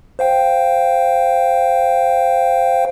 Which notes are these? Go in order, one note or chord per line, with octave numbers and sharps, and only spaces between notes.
C5 F5 G5